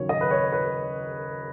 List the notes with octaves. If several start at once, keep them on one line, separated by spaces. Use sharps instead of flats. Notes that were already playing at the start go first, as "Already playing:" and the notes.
Already playing: D#2 C#3 F#3 C#5
D#5
B4
C#5
B4